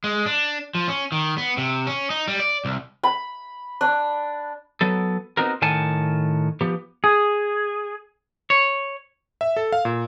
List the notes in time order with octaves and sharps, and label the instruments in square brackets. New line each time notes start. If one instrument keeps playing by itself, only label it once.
[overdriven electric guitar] G#3
D4
F3
C#4
D#3
B3
C3
C#4
D#4
G3
D5
C2
[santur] B5
D4
[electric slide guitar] F#3 B3 A4
B3 C4 D#4 F#4 A#4
A2 D#3 A#4 F#5 G#5 A5
F3 B3 G4
G#4
[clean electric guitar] C#5
[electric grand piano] E5
A4
F5
A#2